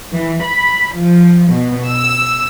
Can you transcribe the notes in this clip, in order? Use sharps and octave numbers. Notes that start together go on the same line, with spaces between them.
E3
B5
F3
B2
E6